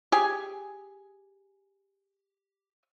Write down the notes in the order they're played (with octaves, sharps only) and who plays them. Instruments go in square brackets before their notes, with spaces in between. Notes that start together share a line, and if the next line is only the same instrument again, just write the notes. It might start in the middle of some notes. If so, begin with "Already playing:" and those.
[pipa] G4 G#4 G#5